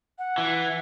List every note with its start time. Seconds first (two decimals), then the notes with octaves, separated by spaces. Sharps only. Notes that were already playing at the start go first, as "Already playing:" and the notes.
0.18 F#5
0.38 E3